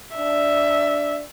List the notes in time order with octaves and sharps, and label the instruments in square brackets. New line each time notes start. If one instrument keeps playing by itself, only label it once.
[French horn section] D4 D5 [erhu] E5